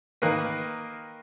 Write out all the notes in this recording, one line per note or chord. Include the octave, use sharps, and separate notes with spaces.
D#3 A#3 B4